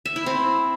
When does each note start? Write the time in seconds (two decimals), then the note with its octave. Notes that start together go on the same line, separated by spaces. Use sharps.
0.05 E5
0.16 E4
0.26 C4